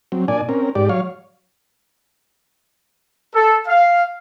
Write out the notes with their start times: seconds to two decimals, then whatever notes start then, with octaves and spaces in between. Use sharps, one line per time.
0.12 F#3 C4
0.28 A#2 D4 D5 G#5
0.49 C4 C#4 A#4
0.75 G#2 G4 D5
0.89 F#3 C#5 F5
3.35 A4
3.68 F5